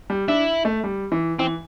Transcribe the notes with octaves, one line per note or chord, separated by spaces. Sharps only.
G3
D4 E4
A3
G3
E3
E3 C4